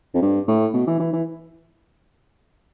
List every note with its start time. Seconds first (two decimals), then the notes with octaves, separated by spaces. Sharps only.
0.14 F2
0.22 G2
0.48 A2
0.74 B2
0.87 E3
1.00 E3
1.13 E3